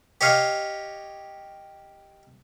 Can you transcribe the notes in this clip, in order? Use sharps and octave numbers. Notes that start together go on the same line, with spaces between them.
G4 C#5 D#5 F5